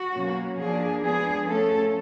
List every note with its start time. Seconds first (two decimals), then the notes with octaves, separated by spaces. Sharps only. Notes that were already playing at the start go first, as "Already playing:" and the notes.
Already playing: F#4
0.14 B2 F#3 A#3 C#4
0.58 F3 A#3 D4 G#4
1.02 F3 G#3 B3 D4 G#4
1.46 F3 A3 C#4 A4